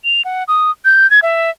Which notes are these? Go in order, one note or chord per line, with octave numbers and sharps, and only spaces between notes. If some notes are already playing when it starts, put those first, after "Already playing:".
F7
F#5
D#6
G6
G#6
E5